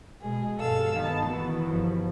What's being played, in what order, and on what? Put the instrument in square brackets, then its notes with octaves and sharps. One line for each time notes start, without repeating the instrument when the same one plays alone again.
[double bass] B2 G#3 [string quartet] G#4
[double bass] G2 B2 [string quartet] A4 F5 E6
[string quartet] D#3 A5 [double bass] B3 D#4
[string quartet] B2 D#3 E3 [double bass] B3
[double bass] G1 F3